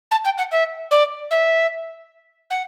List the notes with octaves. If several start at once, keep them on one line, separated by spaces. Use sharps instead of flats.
A5
G5
F#5
E5
D5
E5
F#5